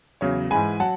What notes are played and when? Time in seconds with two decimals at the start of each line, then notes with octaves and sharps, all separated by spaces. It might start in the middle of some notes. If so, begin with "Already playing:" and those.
0.21 E2 C#3 F#3 C#5
0.50 G#2 E3 G#3 G#5 B5
0.80 F#3 F#5 A5